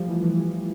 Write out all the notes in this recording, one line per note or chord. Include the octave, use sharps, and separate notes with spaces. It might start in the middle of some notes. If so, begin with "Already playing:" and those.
Already playing: F3 G3 A3
E3
E3